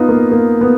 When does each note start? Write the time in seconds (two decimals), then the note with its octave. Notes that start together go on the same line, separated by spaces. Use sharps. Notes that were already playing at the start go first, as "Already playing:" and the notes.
Already playing: B3 D#4 F4
0.09 A#3
0.31 A#3
0.61 B3